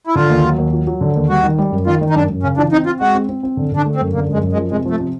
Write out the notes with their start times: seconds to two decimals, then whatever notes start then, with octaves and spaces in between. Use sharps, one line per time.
0.07 E4
0.15 D3 F4
0.30 D#2
0.45 F#3
0.58 D#2
0.73 F#3
0.87 F#3
1.01 D3
1.16 D#2
1.30 G3 F#4
1.43 D#3
1.58 G3
1.72 F#2
1.86 D#3 F4
2.01 D#3
2.10 D#4
2.15 F#2 D4
2.28 F#2
2.43 C#3 C#4
2.57 E3 D4
2.72 C4 D#4
2.86 C4 F4
3.00 G#3 F#4
3.15 C4
3.29 C4
3.43 C4
3.57 D3
3.72 D3 D4
3.85 A3
3.95 C4
4.01 F#2
4.14 D3 A#3
4.29 F#2 G#3
4.43 F#2
4.53 G#3
4.57 F3
4.71 C3 G#3
4.85 F3 A3
5.00 C3